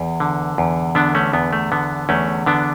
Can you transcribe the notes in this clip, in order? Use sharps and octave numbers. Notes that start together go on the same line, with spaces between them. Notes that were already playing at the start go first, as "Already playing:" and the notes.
Already playing: E2
D3
E2
D3 B3 D4
A3 C#4
E2 B3
A3
D3 B3
E2 A3 C#4
D3 B3 D4